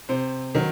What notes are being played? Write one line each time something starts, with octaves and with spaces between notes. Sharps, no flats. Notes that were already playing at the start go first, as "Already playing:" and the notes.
C3 C5
D#3 F#3